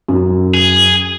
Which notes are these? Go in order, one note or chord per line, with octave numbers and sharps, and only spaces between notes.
F#2
G#4